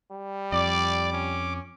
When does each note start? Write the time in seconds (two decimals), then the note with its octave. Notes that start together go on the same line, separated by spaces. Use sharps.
0.11 G3
0.52 F2 D5 D6
1.12 C#4